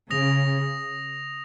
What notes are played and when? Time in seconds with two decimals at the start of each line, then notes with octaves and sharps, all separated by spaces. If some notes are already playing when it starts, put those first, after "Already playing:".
0.10 C#3 D#6 A#6 F7